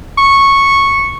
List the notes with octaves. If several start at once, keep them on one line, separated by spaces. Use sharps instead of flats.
C#6